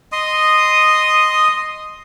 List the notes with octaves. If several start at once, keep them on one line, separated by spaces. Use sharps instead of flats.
D#5 C6 D#6